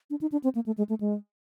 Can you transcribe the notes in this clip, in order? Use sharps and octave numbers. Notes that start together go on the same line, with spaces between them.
D4
D#4
D4
C4
A#3
A3
G#3
A3
G#3